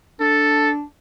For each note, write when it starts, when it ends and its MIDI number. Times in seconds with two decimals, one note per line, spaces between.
0.20 0.83 62
0.20 0.70 69